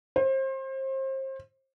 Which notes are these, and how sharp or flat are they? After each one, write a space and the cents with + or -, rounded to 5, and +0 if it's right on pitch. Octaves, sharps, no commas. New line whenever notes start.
C5 +30